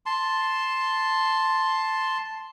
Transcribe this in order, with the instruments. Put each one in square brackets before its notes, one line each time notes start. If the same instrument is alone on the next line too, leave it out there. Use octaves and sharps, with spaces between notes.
[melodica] A5 C6